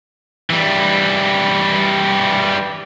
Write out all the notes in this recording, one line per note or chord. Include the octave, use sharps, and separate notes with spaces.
E3 G3